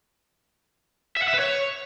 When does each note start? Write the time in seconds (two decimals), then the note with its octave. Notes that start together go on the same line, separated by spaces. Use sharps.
1.17 E5
1.22 F#5
1.28 E5
1.34 B4
1.39 C#5